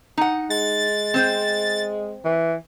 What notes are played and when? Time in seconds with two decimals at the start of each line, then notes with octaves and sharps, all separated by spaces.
0.17 D#4 F#5
0.50 G#3 A6
1.14 C4 C5
2.25 E3